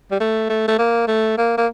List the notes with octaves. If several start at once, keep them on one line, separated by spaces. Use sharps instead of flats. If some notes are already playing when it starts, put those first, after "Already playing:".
G3
A3
A3
A3
A#3
A3
A#3
A#3